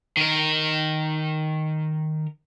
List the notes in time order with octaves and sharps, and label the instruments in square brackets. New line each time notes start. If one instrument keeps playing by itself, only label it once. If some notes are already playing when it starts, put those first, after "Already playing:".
[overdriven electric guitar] D#3 A#4